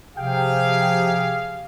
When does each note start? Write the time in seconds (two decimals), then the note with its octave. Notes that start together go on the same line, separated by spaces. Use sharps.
0.17 C3 F3 G4 G#4 F5 G5